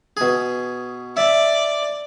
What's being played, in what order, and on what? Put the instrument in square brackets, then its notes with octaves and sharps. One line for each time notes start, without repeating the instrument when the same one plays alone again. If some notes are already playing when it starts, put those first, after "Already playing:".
[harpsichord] B2 G#4
[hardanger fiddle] D5 [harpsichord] E5